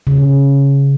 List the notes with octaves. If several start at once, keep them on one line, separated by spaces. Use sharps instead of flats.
C#3